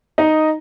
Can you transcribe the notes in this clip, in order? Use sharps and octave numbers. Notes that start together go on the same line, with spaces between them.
D#4 D#5